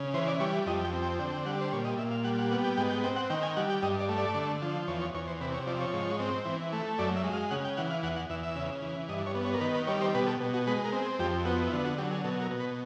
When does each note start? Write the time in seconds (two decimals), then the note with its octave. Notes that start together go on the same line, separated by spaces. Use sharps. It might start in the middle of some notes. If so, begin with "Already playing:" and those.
Already playing: C#3
0.14 E3 C5
0.27 D5
0.40 G3 C#5
0.66 F2 D#5
0.85 G5
0.92 C4
1.02 G5
1.19 D3 G5
1.32 G5
1.46 G3 F#5
1.61 C5
1.73 A#2 C#5
1.85 D#5
1.98 A#2 E5
2.11 F5
2.24 G3 F#5
2.38 F#5
2.51 B3 F#5
2.64 G5
2.77 G#2 G5
2.90 G5
3.04 C4 G5
3.16 F#5
3.30 D#3 G5
3.42 G#5
3.56 G3 F#5
3.70 G5
3.82 G2 D#5
4.00 D5
4.09 A3
4.18 D5
4.35 D3
4.62 F3
4.88 E2 C#5
5.01 C#5
5.14 E2 C#5
5.28 C5
5.41 C3 B4
5.54 C#5
5.67 F3 D5
5.80 C#5
5.93 G#2
6.20 C4
6.45 E3
6.73 A3
6.99 F#2 D5
7.16 E5
7.24 G#3
7.33 F5
7.51 C#3 F#5
7.64 G5
7.77 E3 F#5
7.90 F5
8.03 E2 F#5
8.16 F#5
8.30 E2 E5
8.43 E5
8.56 C#3
8.82 E3
9.09 G2 D#5
9.26 C#5
9.35 B3
9.45 C#5
9.54 A#4
9.61 D#3 B4
9.74 B4
9.87 G3 C#5
10.01 C5
10.15 B2 B4
10.27 A4
10.40 B2
10.54 F#4
10.67 G#3 B4
10.85 A#4
10.92 C4
11.02 G#4
11.19 F2 G4
11.45 B3 F#4
11.67 E4
11.72 D3 F4
11.85 F#4
11.98 F#3 G4
12.12 G#4
12.24 B2 A4
12.42 A#4
12.51 B2
12.60 B4